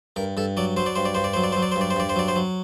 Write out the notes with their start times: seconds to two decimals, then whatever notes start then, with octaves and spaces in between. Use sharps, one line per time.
0.16 G2 A#4
0.37 G2 A4
0.57 F#3 D5
0.77 F#3 C5
0.86 D5
0.96 G2 C5
1.05 D5
1.15 G2 C5
1.24 D5
1.34 F#3 C5
1.44 D5
1.52 F#3 C5
1.62 D5
1.72 C5
1.76 G2 D5
1.90 C5
1.96 G2 D5
2.09 C5
2.16 F#3 D5
2.28 C5
2.36 F#3